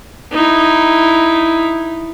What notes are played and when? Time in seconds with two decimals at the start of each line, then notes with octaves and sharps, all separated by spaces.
0.32 D#4 E4